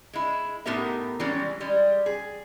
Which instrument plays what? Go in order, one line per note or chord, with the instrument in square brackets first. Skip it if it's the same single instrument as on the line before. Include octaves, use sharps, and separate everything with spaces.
[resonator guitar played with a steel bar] G#3 E4
A2 B3 D#4 G4 A#4 E5
E3 G3 G#3 C#4
G3 G#3
G#4